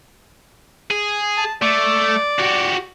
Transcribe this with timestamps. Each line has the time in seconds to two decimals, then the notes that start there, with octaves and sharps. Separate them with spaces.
0.91 G#4
1.37 A5
1.62 A3 D5
2.39 F#4 G4